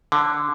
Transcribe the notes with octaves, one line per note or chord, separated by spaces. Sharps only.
D3